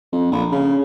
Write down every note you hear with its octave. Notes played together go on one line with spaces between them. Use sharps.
F2
A#1
C#3